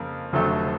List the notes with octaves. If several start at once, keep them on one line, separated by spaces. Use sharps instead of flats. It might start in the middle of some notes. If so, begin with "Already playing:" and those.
Already playing: F2 C#3 A#3
F1 F2 D3 F#3 A3